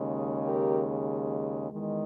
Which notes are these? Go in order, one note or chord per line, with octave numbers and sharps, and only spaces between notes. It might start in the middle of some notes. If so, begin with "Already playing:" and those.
Already playing: D#2 C#3 G#3
G4 A#4
E2 D#3 G#3